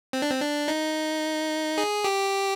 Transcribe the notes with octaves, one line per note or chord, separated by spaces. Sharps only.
C4
D4
C4
D4
D#4
G#4
G4